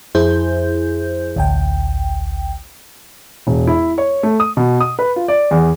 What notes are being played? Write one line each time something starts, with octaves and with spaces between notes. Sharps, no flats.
F2 E4 G#4 C5 G6
A1 D2 G5
E1
E4
C#5
A3
D#6
B2
D#6
B4
F4
D5
E2